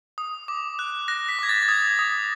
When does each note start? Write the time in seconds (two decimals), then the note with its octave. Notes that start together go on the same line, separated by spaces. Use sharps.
0.18 D#6
0.48 D6
0.79 F#6
1.08 F#6 A#6
1.29 B6
1.39 D6 G#6
1.49 A6
1.62 A6
1.68 D#6 G#6
1.99 D#6